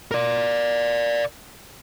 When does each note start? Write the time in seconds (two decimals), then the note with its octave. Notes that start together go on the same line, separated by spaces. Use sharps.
0.11 A#4 D5